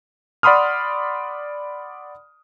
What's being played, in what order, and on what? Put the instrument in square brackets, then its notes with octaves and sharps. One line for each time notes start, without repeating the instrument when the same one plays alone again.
[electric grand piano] D5 F#5 B5 C6 D#6 F6